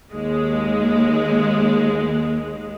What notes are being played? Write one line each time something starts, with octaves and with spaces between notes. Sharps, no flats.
D#2 G#3